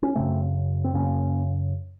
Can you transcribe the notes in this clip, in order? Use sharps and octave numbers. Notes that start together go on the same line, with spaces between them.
C#4
F#2 C#3 A3 C4
C4
F#2 C#3 A#3 C#4